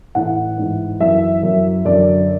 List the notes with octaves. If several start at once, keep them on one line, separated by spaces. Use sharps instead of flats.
A2 E3 F#5
G#2 E3
F#2 E3 E5
F#2 E3
F#2 D3 D5